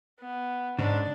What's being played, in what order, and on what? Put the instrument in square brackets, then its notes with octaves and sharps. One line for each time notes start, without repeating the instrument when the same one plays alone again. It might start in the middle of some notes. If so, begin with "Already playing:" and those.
[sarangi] B3
[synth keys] G#2 [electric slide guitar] C#3 [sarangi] D4